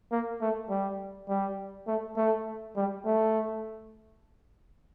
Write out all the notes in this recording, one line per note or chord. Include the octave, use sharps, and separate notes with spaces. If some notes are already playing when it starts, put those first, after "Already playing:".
A#3
A3
G3
G3
A3
A3
G3
A3